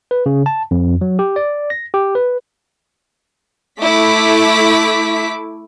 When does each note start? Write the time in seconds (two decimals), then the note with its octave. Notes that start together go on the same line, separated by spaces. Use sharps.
0.11 B4
0.26 C#3
0.46 A5
0.71 F2
1.01 F#3
1.19 G4
1.36 D5
1.70 A#6
1.94 G4
2.15 B4
3.80 A3 E4 D6 B6